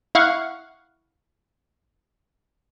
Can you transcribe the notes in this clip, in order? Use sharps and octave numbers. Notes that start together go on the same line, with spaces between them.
E4 F5 F#5 C#6